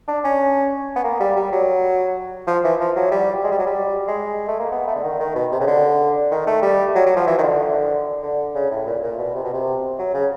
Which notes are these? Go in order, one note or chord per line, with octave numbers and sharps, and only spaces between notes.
D4
C#4
B3
A#3
G3
G3
F#3
F3
E3
F3
F#3
G3
G#3
G3
F#3
G3
G#3
A3
A#3
B3
A3
D3
D#3
D#3
B2
C3
C#3
D3
D#3
A3
G3
F#3
F#3
F3
E3
D#3
D3
D3
C#3
A2
A#2
A#2
B2
C3
B2
C3
F#3
C#3